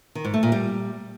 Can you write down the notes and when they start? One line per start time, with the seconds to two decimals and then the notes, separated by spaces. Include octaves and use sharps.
0.15 D#3
0.25 G#2
0.34 A3
0.43 A#2
0.52 G3